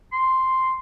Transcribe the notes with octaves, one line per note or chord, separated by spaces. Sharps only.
C6